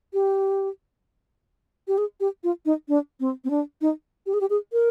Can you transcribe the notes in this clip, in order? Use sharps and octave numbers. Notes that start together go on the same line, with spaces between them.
G4
G4
G#4
G4
F4
D#4
D4
C4
C4
D4
D#4
G4
G#4
G4
G#4
A#4